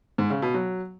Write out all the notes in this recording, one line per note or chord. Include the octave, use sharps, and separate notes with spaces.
G#2
C#3
B2
F#3